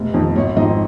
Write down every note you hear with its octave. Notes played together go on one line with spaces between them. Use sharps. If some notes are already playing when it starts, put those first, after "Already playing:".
Already playing: F1
F2 D#3
G#1 C#5
G#2 F3 C4 D#4 D#5